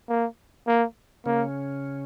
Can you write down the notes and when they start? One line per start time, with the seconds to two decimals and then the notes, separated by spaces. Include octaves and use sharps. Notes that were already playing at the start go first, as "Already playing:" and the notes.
0.09 A#3
0.67 A#3
1.26 C#3 A#3 C#4